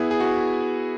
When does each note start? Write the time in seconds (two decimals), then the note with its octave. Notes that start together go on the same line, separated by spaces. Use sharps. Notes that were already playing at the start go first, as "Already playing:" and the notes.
Already playing: B3 E4 G#4
0.11 G#4
0.20 F#4